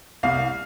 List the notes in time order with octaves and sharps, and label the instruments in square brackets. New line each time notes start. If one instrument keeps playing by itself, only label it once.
[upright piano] C2 F5